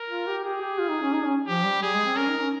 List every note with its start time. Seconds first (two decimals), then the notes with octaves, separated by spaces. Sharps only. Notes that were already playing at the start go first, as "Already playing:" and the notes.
Already playing: A#4
0.10 F4
0.27 G4
0.44 G4 G#4
0.62 G4
0.79 F4
0.90 D#4
1.02 C#4
1.13 D#4
1.25 C#4
1.47 F3 G4
1.65 G3
1.82 G3 G#4
1.93 G#3
2.05 C4
2.17 C#4 A#4
2.29 D#4
2.40 C#4